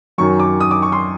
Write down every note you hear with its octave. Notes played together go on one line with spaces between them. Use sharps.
F#2 D#3 F#3 C#6
D6
D#6
D6
C#6
C6